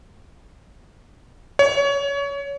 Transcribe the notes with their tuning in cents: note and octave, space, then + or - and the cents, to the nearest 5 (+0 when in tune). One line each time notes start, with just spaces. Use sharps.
C#5 +25